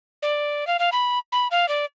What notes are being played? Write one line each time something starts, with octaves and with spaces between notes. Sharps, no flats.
D5
F5
F5
B5
B5
F5
D5